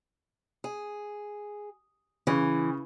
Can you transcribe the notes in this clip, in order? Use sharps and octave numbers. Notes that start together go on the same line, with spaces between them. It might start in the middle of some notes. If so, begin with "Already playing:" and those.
G#4
C#3 E3